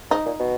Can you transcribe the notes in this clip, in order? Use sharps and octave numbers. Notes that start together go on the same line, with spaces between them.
G#2 D#4
A#2
B2